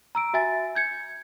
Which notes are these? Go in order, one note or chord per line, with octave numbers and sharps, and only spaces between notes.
A#5 E6 D7
F#4 E5 G#5 A6
G6 G#6 C#7